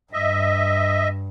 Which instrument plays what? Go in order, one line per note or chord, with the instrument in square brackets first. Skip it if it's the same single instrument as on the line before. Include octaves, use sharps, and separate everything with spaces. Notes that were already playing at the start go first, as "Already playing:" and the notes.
[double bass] G2 [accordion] D#5 E5